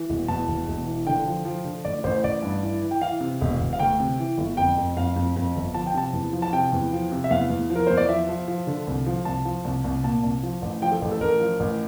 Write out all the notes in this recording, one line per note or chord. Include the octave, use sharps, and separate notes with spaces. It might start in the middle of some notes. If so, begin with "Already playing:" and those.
Already playing: E3
E1
E2 A5
E1
E1
E3
D3 G5
F3
F3
D3
A1 D5
A1 C5
A1 D5
G2
E3
E3
G5
E3 F5
C3
E1
E1
F5
D2 G5
C3
E3
G1
F2 G5
F2
F2 F5
F2
F2
G1
F3 A5
G5
C3 A5
E2
F3
A5
C3 G5
E2
F3
C3
E5
E2 F5
E2
F3
A#4
E2 C5
D5
F3 E5
F3
F3
D3
C2
F3
C2 A5
F3
C2
C2
A#2 A5
C2
F3
A1
F3 G5
A4
A1
A4
A1 A#4
F3
A1